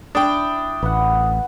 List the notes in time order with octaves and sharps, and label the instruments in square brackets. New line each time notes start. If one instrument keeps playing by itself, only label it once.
[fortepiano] D4 G5 [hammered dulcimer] E4 [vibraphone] D#6
[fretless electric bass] A1 [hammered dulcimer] B4 F#5